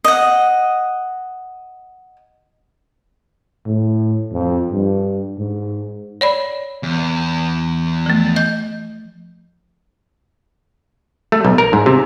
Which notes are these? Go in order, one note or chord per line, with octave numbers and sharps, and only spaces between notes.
D#5 F#5
A2
F2
G2
G#2
C#5 D5 B5
E2
F3 A3
D#5 G6
A3
B1
A#4
G#2
C3